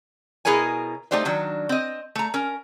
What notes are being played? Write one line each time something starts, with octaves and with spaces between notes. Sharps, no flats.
B2 E4 G#4 A#4 C#5 G#5
A3 D#4 G4 C5 D5
D#3 F#3 D4
C4 D#5
A3 A#5
C#4 A#4